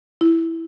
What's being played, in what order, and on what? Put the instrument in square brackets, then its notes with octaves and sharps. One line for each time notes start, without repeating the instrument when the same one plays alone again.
[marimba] E4